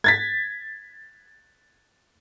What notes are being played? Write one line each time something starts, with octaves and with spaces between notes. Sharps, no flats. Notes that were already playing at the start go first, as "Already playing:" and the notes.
G#6 A6 B6